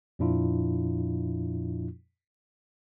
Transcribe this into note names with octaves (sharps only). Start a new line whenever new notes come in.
F2 A#2 F3 D4 E4 F4